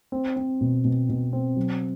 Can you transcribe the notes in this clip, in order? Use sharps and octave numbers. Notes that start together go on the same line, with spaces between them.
C4
C4
B2
B2
B2
C4
F#3